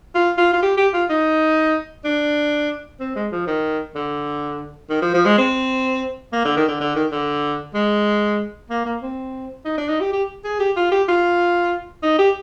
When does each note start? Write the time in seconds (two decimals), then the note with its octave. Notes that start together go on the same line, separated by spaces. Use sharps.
0.15 F4
0.38 F4
0.53 F4
0.62 G4
0.77 G4
0.94 F4
1.10 D#4
2.04 D4
3.00 C4
3.16 G#3
3.32 F3
3.47 D#3
3.95 D3
4.90 D#3
5.02 F3
5.14 F3
5.25 G#3
5.38 C4
6.33 A#3
6.45 D3
6.57 D#3
6.68 D3
6.80 D3
6.95 D#3
7.11 D3
7.74 G#3
8.70 A#3
8.85 A#3
9.02 C4
9.65 D#4
9.78 D4
9.89 D#4
10.00 G4
10.13 G4
10.44 G#4
10.60 G4
10.76 F4
10.92 G4
11.08 F4
12.03 D#4
12.19 G4